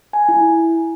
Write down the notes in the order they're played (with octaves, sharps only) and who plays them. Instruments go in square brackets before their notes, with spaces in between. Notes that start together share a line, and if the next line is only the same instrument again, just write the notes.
[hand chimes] G#5
E4